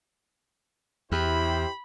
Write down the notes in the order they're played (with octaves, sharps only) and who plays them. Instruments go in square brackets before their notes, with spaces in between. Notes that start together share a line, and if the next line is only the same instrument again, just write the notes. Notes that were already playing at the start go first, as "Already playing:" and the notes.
[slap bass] E2 [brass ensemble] E4 G4 C5 [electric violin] B5